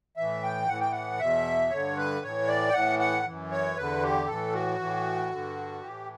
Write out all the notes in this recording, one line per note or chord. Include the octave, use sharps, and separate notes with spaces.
A2 E3 E5
G5
A2 E3 F#5
G5
F#5
E2 B2 E5
G2 D3 C#5
B4
A2 E3 C#5
D5
G5
A2 E3 F#5
F#5
F#2 E3
C#5
E2 D3 B4
G4
A2 E3 A4
F#4
A2 E3
G2 D3
A2 E3 G4